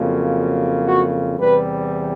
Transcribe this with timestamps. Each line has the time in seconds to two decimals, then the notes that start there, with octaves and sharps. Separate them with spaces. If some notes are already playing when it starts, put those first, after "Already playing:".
Already playing: F2 C#3 F#3 A#3
0.84 F#4
1.38 E2 C3 E3 G3 B4